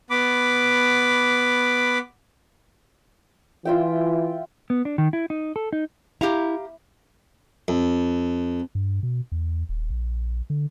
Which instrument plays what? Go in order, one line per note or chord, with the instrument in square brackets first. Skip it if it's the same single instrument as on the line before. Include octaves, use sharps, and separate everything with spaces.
[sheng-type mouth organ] B3 B5 D6
[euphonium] E3 [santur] F4 E5 G5
[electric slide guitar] B3
D4
D#3
E4
D#4
A4
D#4
[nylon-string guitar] E4 [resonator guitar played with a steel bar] G4 F5 A#5
[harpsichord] F2
[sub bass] G2
B2
E2
D#1
A#1
D3